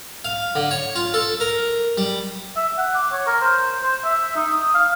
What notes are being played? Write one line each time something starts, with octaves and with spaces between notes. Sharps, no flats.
F5
D3
C#5
F4
A4
A#4
G3
E5
F#5
D6
C#5
A#4
C5
C5
E5
D#4
D#6
F5